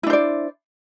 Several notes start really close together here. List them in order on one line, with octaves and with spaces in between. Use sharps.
E4 D4 C5 D5